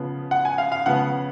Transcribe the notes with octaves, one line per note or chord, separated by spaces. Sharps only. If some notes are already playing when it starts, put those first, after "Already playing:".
Already playing: C#3 F3 B3
F#5
G#5
F5
F5
C#3 F3 B3 F#5